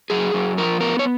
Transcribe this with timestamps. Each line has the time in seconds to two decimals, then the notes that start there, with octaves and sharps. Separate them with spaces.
0.10 F#2 G#4
0.34 F#2
0.58 F3 A#4
0.81 B3 A#4
0.99 C#5